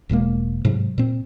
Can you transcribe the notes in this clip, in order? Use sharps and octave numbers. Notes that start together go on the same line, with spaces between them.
E1 B2 G#3 A#3
G#2 C3 F#3
A#2 C4